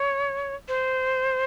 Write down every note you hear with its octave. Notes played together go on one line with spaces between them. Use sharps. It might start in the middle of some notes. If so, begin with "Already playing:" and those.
Already playing: C#5
C5